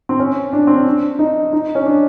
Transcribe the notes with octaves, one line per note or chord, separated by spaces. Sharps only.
C4
C#4
D4
C4
C#4
D4
D#4
D#4
C#4
D4